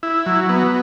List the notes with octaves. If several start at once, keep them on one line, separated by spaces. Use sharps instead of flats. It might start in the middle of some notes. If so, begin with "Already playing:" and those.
E4
F#3
B3